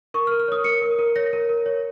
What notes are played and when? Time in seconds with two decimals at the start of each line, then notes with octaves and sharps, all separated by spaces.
0.14 A#4 C#6
0.27 F6
0.32 A#4
0.40 F6
0.48 C#5 D#6
0.64 A#4 C#7
0.82 A#4
0.99 A#4
1.16 C#5 A#6
1.33 A#4
1.49 A#4
1.66 C#5